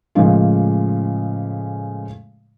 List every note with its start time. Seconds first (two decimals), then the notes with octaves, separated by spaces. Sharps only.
0.15 A2 C#3 F3 G#3 A#3